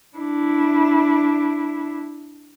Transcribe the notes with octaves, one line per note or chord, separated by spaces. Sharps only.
D4 E4